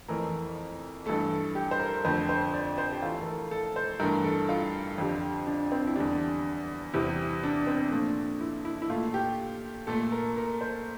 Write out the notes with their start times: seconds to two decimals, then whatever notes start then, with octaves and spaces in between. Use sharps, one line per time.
0.08 F2 E3 A3 A#4
1.06 G2 E3 A3 A4
1.55 G4
1.71 C5
1.79 A#4
2.05 F2 D3 A3 C5
2.29 C5
2.54 D5
2.78 C5
2.92 G4
3.02 A2 E3 A3 F4
3.22 A#4
3.26 A4
3.51 A4
3.76 C5
4.00 G2 E3 A3 A#4
4.24 A4
4.49 F4
4.98 F2 D3 G3
5.47 D4
5.72 C4
5.87 E4
5.96 E2 D3 G3 D4
6.93 E2 C3 G3 E4
7.43 D4
7.67 C4
7.91 A#2 F3 A3 D4
8.41 E4
8.65 E4
8.82 E4
8.90 A#2 A3 F4
9.14 G4
9.87 A#2 A3 A4
10.12 A#4
10.36 A#4
10.61 C5